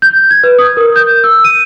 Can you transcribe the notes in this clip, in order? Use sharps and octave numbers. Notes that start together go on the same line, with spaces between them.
G6
G#6
B4
D#6
A#4
G6
E6
D#7